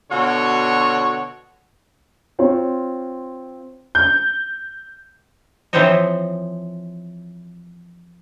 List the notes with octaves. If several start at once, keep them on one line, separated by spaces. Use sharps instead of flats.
B2 D3 F#4 C#5
C4 F4 C#5
G6
E3 F3 C4 C5 C#5 D#5